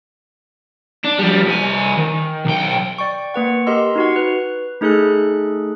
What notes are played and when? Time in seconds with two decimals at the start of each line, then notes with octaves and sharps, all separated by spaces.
1.04 D4
1.19 F3 G3
1.46 C2 G#5
1.97 D#3
2.46 B1 G5
2.98 D5 G5 C#6
3.34 A#3 B4 F#5
3.67 G4 A#4 D#5 C6 E6
3.95 D#4 F#4 F#5
4.16 B4
4.81 A3 D#4 G#4 A4 F#6